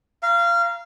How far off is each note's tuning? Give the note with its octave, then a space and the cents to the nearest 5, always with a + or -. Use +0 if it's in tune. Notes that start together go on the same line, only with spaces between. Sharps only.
F5 -25 A#5 +10